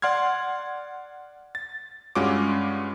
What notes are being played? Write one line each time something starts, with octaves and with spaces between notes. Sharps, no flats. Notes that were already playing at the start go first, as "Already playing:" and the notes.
D5 F#5 C6 F6 G#6
A6
G2 G#3 C#4 F4 F#4 D6